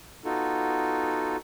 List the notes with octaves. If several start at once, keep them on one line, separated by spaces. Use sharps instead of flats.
B3 D#4 F4 F#4 A4